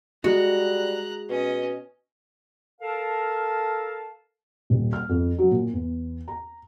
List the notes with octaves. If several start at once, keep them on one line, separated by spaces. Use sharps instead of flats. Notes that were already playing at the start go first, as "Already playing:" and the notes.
G3 G#3 F#4 A#5 F#6
B2 C#4 D#5
A4 A#4 F5 A5
D#1
F6
F2
F#3
A#2
E2
A#5